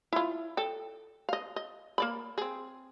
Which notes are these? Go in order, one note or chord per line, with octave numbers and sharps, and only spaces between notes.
E4 F4
A4 G5
D#5 F5
D#5
A#3 D5 B5
C4 G#4